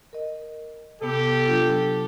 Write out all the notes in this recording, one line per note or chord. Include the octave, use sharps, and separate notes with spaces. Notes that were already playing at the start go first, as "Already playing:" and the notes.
A#4 D#5
C3 B3 G4 A4
F#3 D4 F4